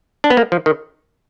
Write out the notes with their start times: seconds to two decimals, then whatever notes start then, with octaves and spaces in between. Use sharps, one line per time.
0.24 D4
0.30 B3
0.37 A#3
0.52 F3
0.66 D#3